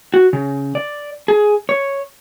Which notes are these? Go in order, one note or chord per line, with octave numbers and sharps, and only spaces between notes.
F#4
C#3
D5
G#4
C#5